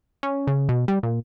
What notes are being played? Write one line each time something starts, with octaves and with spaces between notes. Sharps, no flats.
C#4
C#3
B2
G3
A#2